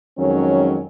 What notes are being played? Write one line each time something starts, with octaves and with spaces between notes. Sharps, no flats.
F2 D#3 F#3 G#3 C#4